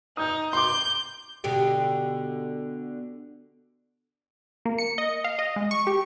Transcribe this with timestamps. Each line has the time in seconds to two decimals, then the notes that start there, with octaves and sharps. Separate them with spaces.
0.17 D#4 D#6 G6
0.53 C6 D6 G6
1.44 B2 D3 G4
4.65 A#3
4.78 C#7
4.98 D#5
5.24 F5
5.39 D#5
5.56 G#3
5.71 C#6
5.87 G4